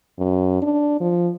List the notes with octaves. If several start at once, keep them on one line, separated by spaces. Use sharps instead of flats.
F#2
D4
F3